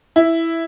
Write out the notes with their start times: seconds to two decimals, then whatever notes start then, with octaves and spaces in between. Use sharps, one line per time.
0.16 E4